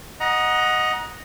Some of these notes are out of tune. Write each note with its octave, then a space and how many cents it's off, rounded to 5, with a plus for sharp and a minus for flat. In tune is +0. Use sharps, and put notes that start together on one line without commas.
D#5 +0 F#5 -5 A#5 +25